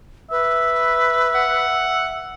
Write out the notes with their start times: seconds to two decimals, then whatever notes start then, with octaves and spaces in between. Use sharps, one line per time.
0.31 B4 E5
1.35 F#5